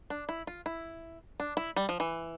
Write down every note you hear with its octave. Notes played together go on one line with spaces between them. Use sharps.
D4
E4
F4
E4
D4
E4
G3
F3
E3